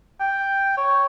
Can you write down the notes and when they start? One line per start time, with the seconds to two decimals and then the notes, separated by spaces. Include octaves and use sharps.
0.20 G5
0.77 C#5